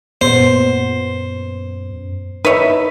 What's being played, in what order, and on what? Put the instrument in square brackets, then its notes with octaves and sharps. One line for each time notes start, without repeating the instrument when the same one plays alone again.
[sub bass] F#2 [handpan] A#2 B3 [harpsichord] C5
[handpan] D#4 E5 [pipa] B4 C#5